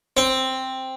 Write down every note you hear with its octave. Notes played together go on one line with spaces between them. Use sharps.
C4